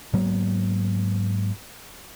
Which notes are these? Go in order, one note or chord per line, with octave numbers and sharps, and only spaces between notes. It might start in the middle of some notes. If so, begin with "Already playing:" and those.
G#2 F#3 A#3 B3